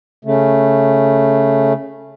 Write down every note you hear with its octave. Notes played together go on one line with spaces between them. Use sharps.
C#3 A3